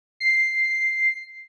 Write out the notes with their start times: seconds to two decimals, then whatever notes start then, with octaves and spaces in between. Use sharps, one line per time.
0.20 C7